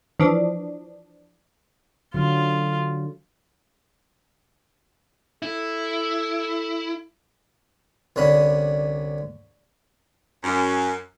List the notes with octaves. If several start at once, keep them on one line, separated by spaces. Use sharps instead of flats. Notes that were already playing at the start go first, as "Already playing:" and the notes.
E3 F3 D4
D3 F#3 F4
E4 A4
C2 D3 C#4 B5
F#2